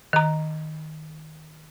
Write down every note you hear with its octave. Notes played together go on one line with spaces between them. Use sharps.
D#3 A#5